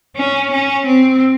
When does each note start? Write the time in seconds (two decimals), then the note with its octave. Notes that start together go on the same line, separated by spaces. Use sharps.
0.16 C#4
0.52 C#4
0.87 C4